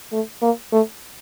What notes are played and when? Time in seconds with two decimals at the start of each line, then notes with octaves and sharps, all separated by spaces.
0.12 A3
0.42 A#3
0.72 A3